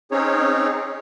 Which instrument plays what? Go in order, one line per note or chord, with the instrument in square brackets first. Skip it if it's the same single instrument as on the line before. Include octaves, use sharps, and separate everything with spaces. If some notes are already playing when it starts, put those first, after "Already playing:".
[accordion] C4 C#4 D#4 G#4 C#5